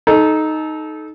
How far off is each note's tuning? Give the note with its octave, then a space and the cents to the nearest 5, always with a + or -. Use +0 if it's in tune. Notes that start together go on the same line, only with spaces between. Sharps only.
D#4 +0 A4 -25